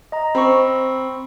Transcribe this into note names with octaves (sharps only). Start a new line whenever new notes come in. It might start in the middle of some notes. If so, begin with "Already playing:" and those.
D#5 A#5
C4 B5 C#6